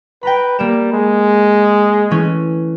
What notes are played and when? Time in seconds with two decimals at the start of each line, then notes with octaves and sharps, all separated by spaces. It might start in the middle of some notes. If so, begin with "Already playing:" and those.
0.23 B4 G5 A#5 B5
0.59 G3 A#3 D7 E7
0.92 G#3
2.11 E3 A3 C#4